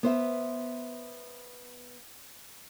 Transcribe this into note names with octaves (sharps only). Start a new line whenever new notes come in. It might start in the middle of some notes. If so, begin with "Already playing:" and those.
B3 C5 E5